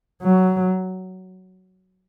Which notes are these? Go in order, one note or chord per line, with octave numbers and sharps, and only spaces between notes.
F#3